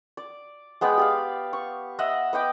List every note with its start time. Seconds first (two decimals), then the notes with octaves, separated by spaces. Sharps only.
0.17 D5
0.81 G#3 B3 D5 G5
0.97 G4 D5 F5
1.53 C#6
1.99 D#5 E5 F#5
2.33 B3 D#5 G5 D6